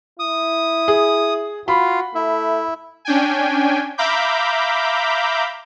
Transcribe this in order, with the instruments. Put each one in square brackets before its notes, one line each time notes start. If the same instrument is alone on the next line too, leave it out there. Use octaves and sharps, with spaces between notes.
[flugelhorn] E4 [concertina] D#6
[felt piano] G#4
[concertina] F4 [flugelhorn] F#4 [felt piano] B5
[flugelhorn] A3 [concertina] E4
[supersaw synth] C#4 D4 G5 G#5
E5 F5 A#5 B5 D6 G6